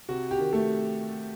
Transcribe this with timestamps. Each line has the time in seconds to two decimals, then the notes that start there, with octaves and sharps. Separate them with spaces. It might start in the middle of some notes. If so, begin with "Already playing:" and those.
0.09 C3 F#4
0.31 G4
0.38 D#3
0.53 A3 A4